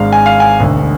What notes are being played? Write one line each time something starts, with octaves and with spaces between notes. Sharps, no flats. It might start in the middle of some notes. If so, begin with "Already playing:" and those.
Already playing: G#1 G#2 G#3 D4 F5
G#5
F5
G#5
E1 D2 D3